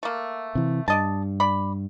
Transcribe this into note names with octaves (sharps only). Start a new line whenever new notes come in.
A3 A#3
C3 E3
G2 D5 D#5 A5
D5 B5